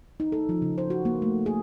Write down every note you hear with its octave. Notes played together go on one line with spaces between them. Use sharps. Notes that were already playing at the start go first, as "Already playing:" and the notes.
D#4
A4
F3
C#3
C5
F#4
A#3
A3
G#4